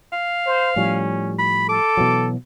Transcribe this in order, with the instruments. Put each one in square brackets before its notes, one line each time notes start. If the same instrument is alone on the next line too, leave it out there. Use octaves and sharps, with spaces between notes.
[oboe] F5
[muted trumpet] C5
[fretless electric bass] A2 F3 G3 [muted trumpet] C#4
[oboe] B5
[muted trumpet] A4 [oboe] D6
[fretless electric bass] B2 E3 F#3